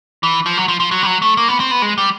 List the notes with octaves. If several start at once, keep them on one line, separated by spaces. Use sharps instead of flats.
E3
F3
F#3
F3
F3
F#3
G3
F#3
A3
A#3
B3
C4
B3
G#3
G3